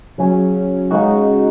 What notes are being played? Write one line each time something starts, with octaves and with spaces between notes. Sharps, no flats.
C#3 F#3 C#4
C#3 G#3 D#4 F#4